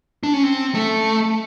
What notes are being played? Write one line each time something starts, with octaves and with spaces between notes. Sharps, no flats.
D4
C#4
C4
A3